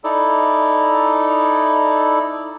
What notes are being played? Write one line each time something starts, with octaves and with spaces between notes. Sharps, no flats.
D#4 E4 A4 D5